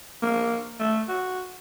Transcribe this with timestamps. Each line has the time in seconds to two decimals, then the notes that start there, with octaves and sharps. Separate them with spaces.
0.22 A#3
0.79 A3
1.08 F#4